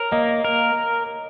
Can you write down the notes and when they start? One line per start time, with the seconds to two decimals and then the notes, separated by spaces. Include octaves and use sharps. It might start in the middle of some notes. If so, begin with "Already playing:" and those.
Already playing: A#4 C#5
0.12 A#3 D#5
0.45 A#4